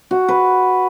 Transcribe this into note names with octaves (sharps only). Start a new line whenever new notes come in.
F#4
B4